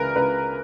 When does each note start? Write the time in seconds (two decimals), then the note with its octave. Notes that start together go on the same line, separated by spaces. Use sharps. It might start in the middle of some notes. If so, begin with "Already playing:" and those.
Already playing: C#2 E3 A#4 B4
0.16 C#2 B4